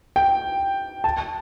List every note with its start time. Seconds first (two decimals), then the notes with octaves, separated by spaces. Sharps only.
0.16 G5
1.04 A5